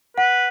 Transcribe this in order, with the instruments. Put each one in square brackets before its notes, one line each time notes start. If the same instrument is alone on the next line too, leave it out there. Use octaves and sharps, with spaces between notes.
[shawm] B4 [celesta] F#5